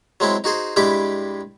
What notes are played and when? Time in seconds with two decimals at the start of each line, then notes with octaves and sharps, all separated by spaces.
0.20 F#3 G#3 C4 E4
0.44 D#4 F#4 G#4 C5
0.76 G2 G#3 E4 G4 B4 D6